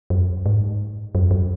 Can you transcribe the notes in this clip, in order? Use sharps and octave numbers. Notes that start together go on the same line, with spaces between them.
F#2
G#2
F#2
F#2